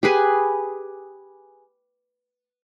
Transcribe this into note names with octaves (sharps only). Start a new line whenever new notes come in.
G4 G#4 B4 G#5